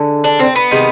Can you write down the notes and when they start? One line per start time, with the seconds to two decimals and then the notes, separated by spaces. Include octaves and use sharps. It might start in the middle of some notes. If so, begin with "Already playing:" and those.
Already playing: D3 G#3
0.24 D4
0.39 C4
0.56 B3
0.71 C3 D#3 G#3